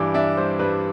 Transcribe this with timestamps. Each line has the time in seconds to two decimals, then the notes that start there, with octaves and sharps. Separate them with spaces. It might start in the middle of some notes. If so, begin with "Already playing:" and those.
Already playing: G2 E3 G3 D4 D6
0.14 D4 E5
0.37 G3 C5
0.59 G2 B4